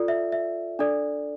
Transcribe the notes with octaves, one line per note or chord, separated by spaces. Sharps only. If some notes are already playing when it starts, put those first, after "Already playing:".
Already playing: F4 A4 D5
E5
E5
D4 A4 D5